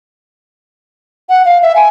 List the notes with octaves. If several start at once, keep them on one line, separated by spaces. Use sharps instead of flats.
F#5
F5
E5
G#5